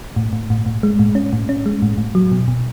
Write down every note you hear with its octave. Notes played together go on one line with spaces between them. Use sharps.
A2
A2
A2
A2
G#3
A2
C#4
A2
C#4
G#3
A2
A2
F#3
B2
B2